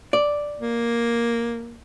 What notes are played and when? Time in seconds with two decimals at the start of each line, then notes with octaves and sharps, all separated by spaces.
0.13 D5
0.59 A#3